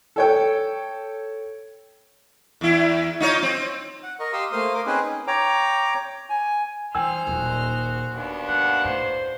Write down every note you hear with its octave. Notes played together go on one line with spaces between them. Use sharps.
A4 C#5 G5
E2 E4
D#4 F4 C#5
C4
F#5
A#4 D#5 C#6
G4 F5 C6 D#6 E6
A3 A#3 C5 F5 C6 D#6
A#4 D6
C4 C#4 D#4 G#4 B4 C5
C#5 G5 A#5 D6
G#5
E3 G3 D#4 C5 G5 G#5 E6 F6
D#1 F#3 F#4
D#2 B3 D4
G#2 F#5
A2 C5